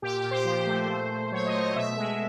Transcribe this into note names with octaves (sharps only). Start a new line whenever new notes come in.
A#2 G4
G4
A#2
C5
F3
A3
A#2
A#2
F#3 C#5
D#5
A3
D#5
B2 E5
G#3